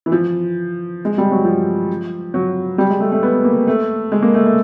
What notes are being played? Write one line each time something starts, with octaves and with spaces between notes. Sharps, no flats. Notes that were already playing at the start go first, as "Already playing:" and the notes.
E3
F3
G#3
G3
F#3
F3
F#3
G3
G#3
A3
A3
B3
A#3
A3
G#3
A#3
A3
A3